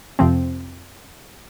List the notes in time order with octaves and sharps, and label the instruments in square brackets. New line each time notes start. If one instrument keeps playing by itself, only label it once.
[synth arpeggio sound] F2 C3 F3 C4